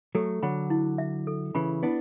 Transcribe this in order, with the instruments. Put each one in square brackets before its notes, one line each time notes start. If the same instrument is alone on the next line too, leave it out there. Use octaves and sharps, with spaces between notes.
[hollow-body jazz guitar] F#3 A3 [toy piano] A4
[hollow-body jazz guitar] D3 F#3 [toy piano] B5
[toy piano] E4
E5
A4
[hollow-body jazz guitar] C#3 E3 [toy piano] B5
[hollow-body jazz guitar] B3 D4 [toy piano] E4